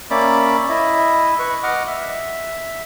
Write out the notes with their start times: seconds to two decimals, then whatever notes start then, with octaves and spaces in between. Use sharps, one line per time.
0.11 A#3 C#4 D5 E5 B5 D6
0.70 E4 D#5 E5
1.39 B4 C#6
1.63 D#5 F#5 D6 F6
1.87 E5